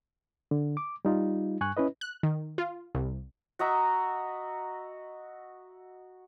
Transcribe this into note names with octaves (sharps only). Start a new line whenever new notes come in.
D3
D6
G3 D#4 F4
G2 G#5 C#6 F#6
C#4 E4 B4 D#5
F#6
D#3
F4
C2
F#4 D#5 E5 A#5